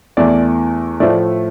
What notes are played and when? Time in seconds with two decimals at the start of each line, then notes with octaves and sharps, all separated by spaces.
0.17 E2 E3 A3 D5
1.00 A2 F3 A3 D5